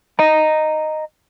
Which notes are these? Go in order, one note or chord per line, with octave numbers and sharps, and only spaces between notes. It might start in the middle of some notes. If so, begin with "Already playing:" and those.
D#5 A#5